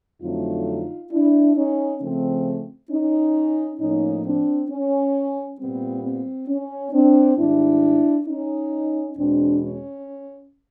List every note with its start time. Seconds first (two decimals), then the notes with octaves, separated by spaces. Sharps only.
0.21 F2 D3 F#3 A3 C4 D#4 F4
1.11 D4 E4
1.56 C#4 D#4
2.00 C#3 F3 A3 C4
2.90 C#4 D#4
3.79 A2 F3 A#3 C#4 D#4
4.24 C4 D4
4.69 C#4
5.58 A#2 G3 B3 C4
6.03 C4
6.48 C#4
6.92 C4 D4
7.37 G#2 D#3 G3 D4 E4
8.27 C#4 D#4
9.16 E2 B2 G#3 C4 D4
9.61 C#4